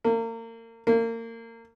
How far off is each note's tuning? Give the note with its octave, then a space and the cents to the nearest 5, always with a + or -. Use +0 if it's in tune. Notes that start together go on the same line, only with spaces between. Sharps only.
A#3 -35
A#3 -30